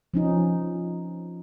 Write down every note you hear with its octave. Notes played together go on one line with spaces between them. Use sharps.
F3 C#4 D#4